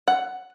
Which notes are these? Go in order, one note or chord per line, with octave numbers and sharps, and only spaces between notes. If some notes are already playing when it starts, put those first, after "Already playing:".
F#5